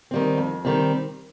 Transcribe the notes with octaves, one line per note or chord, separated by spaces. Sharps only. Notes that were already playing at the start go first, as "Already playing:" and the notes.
D#3 G3 C4
F2
D#3 G3 C4